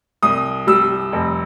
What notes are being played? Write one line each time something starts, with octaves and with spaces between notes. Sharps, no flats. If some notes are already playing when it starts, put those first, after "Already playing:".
C2 D#6
G3 E6
F1